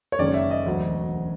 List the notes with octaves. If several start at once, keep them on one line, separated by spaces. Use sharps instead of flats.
C#5
F#1 F#2 D#3 G#3 C#4 D5
E5
D#5
E1 D2 D3 F#3